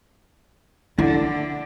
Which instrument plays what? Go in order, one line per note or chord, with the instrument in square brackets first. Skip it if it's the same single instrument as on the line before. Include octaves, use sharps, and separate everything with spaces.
[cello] D3 [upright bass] E4